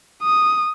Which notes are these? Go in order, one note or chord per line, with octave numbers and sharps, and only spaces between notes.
D#6